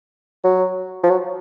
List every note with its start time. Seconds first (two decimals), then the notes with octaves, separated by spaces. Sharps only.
0.44 F#3
1.03 F3
1.10 F#3